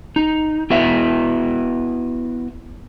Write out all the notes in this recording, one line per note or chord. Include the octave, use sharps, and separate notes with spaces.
D#4
B3 E4 F#4 B4 E5